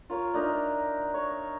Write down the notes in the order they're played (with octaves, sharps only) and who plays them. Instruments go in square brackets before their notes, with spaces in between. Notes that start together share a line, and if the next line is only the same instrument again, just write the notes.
[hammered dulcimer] F4 A#4 C#5
D4 D#4 A#4 E5
C#5